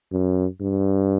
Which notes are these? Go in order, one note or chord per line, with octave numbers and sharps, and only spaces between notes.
F#2
G2